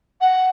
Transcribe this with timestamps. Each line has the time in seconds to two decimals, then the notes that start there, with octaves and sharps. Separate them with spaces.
0.21 F#5